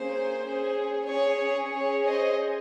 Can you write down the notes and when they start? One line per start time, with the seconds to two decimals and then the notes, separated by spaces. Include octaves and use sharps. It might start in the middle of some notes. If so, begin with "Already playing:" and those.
Already playing: A#3 C#4 G#4 C5
0.40 C#4
0.45 G#4
1.07 C#4 G#4 C#5
1.74 C#4 G#4 C#5
2.07 C5 D#5